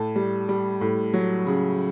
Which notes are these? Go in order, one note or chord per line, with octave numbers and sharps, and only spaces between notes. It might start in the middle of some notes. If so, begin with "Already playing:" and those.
Already playing: A2 A5
G3
G3
A2
F#3
C#3